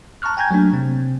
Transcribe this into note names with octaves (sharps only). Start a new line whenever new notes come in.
A5 A#5 C#6 F6 F#6
G5 G#5 A#5 G6 G#6
F#3 A3 A#3 D4
C3 C4